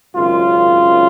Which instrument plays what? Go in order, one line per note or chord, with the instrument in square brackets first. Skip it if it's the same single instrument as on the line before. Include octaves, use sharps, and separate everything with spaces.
[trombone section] G#1 F#2 C#3 F4